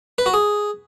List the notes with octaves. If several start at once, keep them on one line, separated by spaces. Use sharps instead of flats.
B4
F#4
G#4